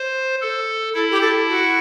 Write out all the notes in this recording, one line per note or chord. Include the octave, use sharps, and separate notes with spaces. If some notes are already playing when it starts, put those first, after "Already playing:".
Already playing: C5
A4
E4 A4
G4
A4
F#4